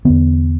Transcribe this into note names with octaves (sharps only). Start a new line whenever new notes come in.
E2 D3 B3